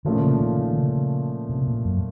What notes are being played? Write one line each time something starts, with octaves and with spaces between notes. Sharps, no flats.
A#2 D#3 F3 A3 C#4 F4
C#3
D#3
D#3
C#3
C3
A#2
F#2